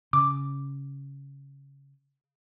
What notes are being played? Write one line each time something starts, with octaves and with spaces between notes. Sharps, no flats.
C#3 D6